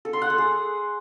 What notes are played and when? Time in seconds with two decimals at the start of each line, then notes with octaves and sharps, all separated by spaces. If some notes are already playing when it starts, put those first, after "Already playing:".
0.05 A4
0.13 C6
0.22 F#5
0.30 A4
0.38 G#4